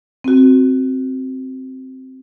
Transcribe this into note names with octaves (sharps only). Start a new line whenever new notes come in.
C4 F#4